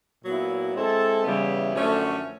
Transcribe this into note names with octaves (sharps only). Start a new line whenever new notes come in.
A#2 F#3 B3 E4
G#3 C4 E4 A4
C#3 E3 G3 B3 E4
F#2 D3 F3 A3 C#4